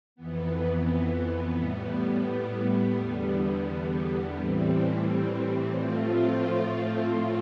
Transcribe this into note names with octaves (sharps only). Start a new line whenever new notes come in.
F2 E3 B3
A2 G3 B3
E2 D3 G3 B3
A2 E3 G3 C4
A2 F3 A3 C4 F4